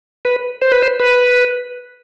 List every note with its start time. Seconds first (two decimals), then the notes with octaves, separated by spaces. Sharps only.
0.25 B4
0.62 C5
0.72 B4
0.83 C5
1.00 B4